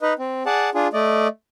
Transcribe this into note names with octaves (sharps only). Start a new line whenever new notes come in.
D#4 B4 D#5
C4
G#4 D5 F#5 A5
D4 F4 G#4
A3 D5 D#5